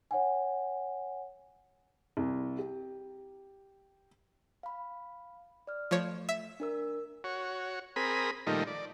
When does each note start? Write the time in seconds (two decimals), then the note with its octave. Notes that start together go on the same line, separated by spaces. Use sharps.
0.11 C#5 F#5 G#5
2.17 C2
2.58 G4
4.63 F5 B5
5.67 D5 F6
5.91 F3 A3 C#5
6.29 E5
6.60 D4 A#4 E6
7.24 F#4 C#5
7.96 C4 G#4 A#4 B5 D#6
8.47 A#2 D#3 F3 G3 A3 D#4
8.67 D5